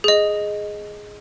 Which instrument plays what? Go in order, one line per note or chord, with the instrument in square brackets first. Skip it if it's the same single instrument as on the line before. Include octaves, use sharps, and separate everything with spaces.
[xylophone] G#4 D#5